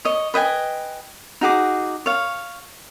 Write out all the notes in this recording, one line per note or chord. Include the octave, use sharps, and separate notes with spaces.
C#5 D#5
B4 D#5 G5 G#5
D#4 F#4 G#4 D6
C#5 F5